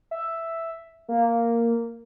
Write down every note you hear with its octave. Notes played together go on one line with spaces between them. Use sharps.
E5
A#3